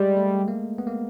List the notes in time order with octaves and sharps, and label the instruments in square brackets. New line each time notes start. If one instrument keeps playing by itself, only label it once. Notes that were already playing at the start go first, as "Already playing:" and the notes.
Already playing: [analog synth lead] G3 [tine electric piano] G#3
[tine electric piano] A3
A#3
B3
A#3